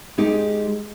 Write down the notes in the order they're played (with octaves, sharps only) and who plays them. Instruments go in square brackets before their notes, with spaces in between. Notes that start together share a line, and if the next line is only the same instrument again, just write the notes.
[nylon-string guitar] G#3 D#4 G4